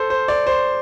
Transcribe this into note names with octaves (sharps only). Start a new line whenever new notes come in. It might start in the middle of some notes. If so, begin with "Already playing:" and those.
Already playing: A4 C5
C5
D5
C5